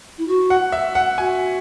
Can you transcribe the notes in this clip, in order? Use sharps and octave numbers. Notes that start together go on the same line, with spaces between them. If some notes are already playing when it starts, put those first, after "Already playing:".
E4
F#4
F#5
E5
F#5
F#4 G#5